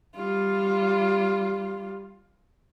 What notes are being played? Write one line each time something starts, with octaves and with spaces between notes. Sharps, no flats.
G3 F4